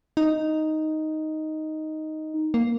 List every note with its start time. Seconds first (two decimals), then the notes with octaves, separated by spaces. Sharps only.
0.17 D#4
2.54 A#3